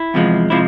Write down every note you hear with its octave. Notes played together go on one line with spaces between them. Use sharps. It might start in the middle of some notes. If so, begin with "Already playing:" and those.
Already playing: E4
E2 C3 F3 G#3
C3 F3 G#3 E4